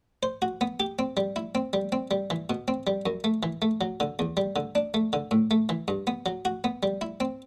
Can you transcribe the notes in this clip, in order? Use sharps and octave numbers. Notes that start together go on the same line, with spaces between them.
C5
F#4
B3
G4
C4
G3
E4
C4
G3
C4
G3
E3
B2
C4
G3
F#2
A3
E3
A3
F#3
D3
E2
G3
D3
D4
A3
D3
A2
A3
E3
G2
B3
F#3
F#4
B3
G3
E4
C4